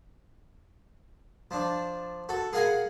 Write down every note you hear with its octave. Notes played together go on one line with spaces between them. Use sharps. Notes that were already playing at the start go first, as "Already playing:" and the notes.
F3 D4
F#4 A4
G#4 A#4 F5 F#5 G#5 A#5